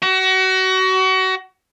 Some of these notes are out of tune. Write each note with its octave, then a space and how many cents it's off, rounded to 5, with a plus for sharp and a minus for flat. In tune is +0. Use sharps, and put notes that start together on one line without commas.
F#4 +30